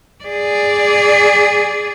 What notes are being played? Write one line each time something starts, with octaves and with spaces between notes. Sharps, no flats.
G#4 D5